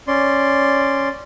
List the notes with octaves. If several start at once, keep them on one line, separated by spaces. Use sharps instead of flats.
C#4 D5 C6